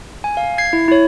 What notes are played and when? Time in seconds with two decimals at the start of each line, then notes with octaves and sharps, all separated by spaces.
0.24 G#5
0.37 F5
0.58 G#6 C7
0.73 E4
0.88 E4 C#5